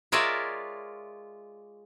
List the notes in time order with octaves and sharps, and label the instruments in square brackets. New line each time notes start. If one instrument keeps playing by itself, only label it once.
[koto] G#3 F4 A#4 C#5 D5 E5